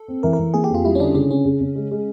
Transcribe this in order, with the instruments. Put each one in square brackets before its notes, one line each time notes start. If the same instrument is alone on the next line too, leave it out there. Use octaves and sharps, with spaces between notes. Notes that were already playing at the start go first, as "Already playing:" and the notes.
Already playing: [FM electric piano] A4
[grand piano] C4
[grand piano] E3 [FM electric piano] A#4
[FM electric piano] A#4
[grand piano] E3
[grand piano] A#3 [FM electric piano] G#4
[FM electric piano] G4
[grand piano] F2 [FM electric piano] F4
[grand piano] G3 [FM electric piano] E4
[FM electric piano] C#4
[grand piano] D3 [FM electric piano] D4
[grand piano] C#3 [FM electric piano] C#4
[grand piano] C#3 [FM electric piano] C#4
[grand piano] C#3
C#3
G#3
G#3